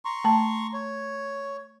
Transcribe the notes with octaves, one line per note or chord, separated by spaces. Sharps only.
A#5 C6 C#6
A3 A5
C#5